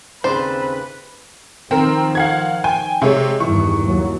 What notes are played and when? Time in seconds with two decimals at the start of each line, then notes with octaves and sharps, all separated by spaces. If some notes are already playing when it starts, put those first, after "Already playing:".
0.24 D#2 C#3 C4 B4 C5 D5
1.71 D#3 F3 C4 A#4
2.15 F5 F#5 G#6
2.64 G5 G#5
3.02 C3 G#3 C#5
3.40 E2 G2 D#3 E3 C#6
3.84 D#2 F#3